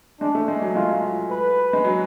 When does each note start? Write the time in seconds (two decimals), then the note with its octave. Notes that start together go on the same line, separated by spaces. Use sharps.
0.20 G#3 D4
0.35 A3
0.48 G#3
0.62 F#3
0.75 G#3 F4
1.30 B4
1.73 G#3
1.84 F#3